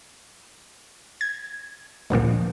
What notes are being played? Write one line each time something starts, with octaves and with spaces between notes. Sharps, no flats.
G#6
G1 D2 A#2 F3